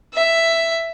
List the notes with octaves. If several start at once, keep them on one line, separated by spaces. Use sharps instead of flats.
E5